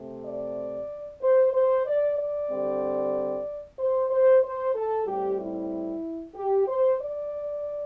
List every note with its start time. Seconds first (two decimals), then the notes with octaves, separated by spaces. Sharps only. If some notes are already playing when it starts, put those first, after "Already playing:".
Already playing: C3 A3 C4
0.25 D5
1.22 C5
1.54 C5
1.86 D5
2.18 D5
2.50 D3 G3 C4
3.79 C5
4.10 C5
4.43 C5
4.75 A4
5.06 A2 G3 C4 G4
5.39 E4
6.35 G4
6.68 C5
7.00 D5